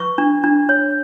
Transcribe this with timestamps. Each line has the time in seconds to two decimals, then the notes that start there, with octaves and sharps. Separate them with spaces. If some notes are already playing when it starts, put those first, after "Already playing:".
Already playing: B4 C#6
0.18 D4
0.44 D4
0.69 C#5